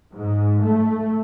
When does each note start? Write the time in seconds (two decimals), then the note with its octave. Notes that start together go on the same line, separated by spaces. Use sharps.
0.16 G#2
0.65 A3